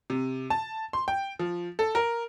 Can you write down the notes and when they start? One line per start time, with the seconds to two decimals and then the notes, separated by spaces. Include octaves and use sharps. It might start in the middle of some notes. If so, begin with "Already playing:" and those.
0.10 C3
0.50 A5
0.93 C6
1.08 G5
1.39 F3
1.79 A4
1.95 A#4